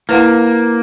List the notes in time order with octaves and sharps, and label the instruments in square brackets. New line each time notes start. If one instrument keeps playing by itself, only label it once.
[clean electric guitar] A#3 [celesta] E4 B4 F#5